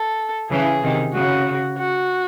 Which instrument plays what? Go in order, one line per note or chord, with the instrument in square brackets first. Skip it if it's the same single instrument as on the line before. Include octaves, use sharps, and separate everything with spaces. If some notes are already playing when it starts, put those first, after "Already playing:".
Already playing: [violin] A4
[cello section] C#3 E3 [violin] G#4
[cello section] C3 D#3
[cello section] C#3 [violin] F#4
[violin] F#4